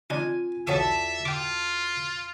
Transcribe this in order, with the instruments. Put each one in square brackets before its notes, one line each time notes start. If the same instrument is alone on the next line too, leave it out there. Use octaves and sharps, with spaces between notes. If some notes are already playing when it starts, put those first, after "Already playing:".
[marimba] C4 F4 [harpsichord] D4 D#4 [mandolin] G#5
[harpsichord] B1 C#5 D#6 [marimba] E2 F#4 [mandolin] A4 D5 [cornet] E5
[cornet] F4 [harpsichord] G5 D6